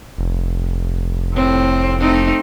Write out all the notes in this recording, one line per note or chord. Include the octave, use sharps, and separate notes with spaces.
F1
A2 C4
A3 C4 D#4